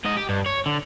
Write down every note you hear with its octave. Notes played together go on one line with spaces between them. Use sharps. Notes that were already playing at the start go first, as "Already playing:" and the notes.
G#2 D#5
G4
G2
C#5
D3